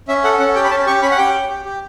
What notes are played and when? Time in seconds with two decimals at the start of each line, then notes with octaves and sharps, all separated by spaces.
0.08 C#4 E5
0.24 A4 F#5
0.39 C#4 F#5
0.55 G4 G5
0.64 B5
0.71 C#4 A5
0.86 G4 C#6
1.02 C#4 B5
1.11 F#5
1.18 G4 G5
1.34 G4
1.49 G4
1.65 G4